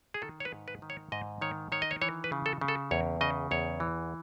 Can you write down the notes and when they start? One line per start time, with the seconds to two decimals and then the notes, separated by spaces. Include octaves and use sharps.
0.14 G#4
0.22 D#3 A4
0.40 C#5
0.45 B4
0.52 G#2
0.68 B4
0.82 D#3
0.90 C#5
1.12 G#2 D#5
1.41 D#3 C#5
1.72 D#3 C#5
1.82 D#5
1.91 C#5
2.02 E3 C#5
2.24 B4
2.32 C#3
2.46 A4
2.61 C#3
2.68 A4
2.91 E2 C#5
3.21 C#3 D#5
3.51 E2 C#5
3.80 E3